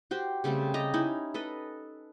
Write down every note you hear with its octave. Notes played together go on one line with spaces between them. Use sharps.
F#4 G4 C5
C#3 G3 A3 C4
G4 D#5 A5 A#5
C#4 D#4 E4
A4 B4 D#5